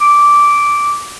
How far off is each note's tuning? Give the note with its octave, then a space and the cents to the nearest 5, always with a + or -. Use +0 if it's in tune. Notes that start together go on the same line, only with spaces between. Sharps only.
D6 -10